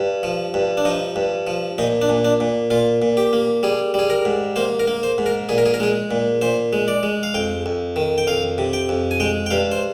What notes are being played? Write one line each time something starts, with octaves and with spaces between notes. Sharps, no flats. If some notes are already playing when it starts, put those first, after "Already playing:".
Already playing: G2
F3
G2
D4
F3 D#4
G2
F3
A#2 D#4
D4
A#2
D4
A#2
A#2 F4
A#2
G4
A#3
G3 G#4
G3 G#4
A#4
G#2
A#3 C5
A#4
A#3
C5
G#2
A#4
A#2 G#4
A#4
G#4
A#4
G#3 G#4
A#2
A#2 C5
G#3
D5
G#3
F5
F2 G5
F2
D#3
G5
F2 F5
C3
G5
F2
G#5
G#3 G5
G5
G2 F5
C5